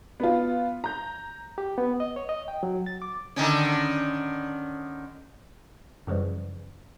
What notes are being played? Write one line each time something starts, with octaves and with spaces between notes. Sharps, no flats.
B3 F4
A#5 G6
G4
B3
D#5
C#5
D#5
G5
F#3
A6
D6
D3 D#3 C#4
F#2 C#3 E3 F3 G3